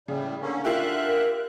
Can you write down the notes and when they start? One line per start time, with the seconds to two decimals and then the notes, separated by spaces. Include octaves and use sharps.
0.08 A2 C#3 G3
0.42 D3 A#3 C#4
0.65 D3 F4 G4 A#4 E5 F#6